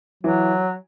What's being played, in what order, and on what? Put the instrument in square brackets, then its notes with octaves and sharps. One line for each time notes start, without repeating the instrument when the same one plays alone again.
[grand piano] E3 [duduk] F#3